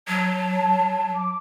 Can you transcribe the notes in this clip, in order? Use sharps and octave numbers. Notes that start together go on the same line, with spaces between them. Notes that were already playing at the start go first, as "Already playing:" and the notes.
F#3 A5
D6